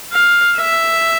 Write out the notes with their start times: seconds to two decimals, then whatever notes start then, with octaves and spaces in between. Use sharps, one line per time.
0.12 F5
0.57 E5